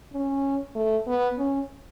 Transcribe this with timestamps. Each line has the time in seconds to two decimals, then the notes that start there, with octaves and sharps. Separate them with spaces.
0.13 C#4
0.75 A3
1.07 B3
1.38 C#4